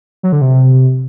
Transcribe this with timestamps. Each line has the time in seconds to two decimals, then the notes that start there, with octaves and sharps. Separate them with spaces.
0.23 F#3
0.32 D3
0.41 C3